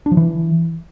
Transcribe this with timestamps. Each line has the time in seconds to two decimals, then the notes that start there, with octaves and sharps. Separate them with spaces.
0.06 D4
0.12 F3
0.17 E3